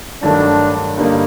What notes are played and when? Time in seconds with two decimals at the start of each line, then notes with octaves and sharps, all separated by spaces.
0.23 G2 D#3 F#3 A3 D4
0.97 G2 D3 G3 A#3 D#4